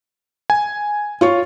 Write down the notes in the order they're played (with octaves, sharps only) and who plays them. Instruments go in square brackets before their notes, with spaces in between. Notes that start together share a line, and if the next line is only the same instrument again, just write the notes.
[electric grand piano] G#5
[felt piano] F4 C#5 C#6